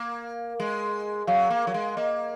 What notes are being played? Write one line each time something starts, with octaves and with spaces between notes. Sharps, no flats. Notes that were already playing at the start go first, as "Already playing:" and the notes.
Already playing: A#3
G#3
F#3 F5
A#3
F#3
G#3
A#3 D#5